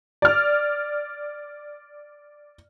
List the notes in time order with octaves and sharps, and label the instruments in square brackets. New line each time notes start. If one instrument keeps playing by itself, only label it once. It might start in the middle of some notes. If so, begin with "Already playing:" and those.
[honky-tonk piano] D5 F6